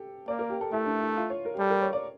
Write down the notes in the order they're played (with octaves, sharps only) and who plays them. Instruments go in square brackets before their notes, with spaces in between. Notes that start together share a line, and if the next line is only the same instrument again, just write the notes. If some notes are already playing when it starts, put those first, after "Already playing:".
Already playing: [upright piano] G4 A4
[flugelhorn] A#3 [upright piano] D5
[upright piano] A#4
G4
A4
[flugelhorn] A3 [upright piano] E4
[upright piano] D4
E4
F4
C#5
A#4
G4
[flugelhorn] G3 [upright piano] A4
[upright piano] A#4
C#5
D5